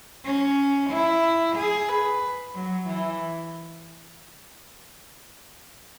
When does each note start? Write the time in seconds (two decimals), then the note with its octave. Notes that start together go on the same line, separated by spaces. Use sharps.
0.24 C#4
0.90 E4
1.56 G#4
1.89 B4
2.54 F#3
2.88 E3